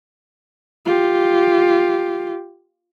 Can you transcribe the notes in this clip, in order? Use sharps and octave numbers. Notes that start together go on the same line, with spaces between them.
F4 G4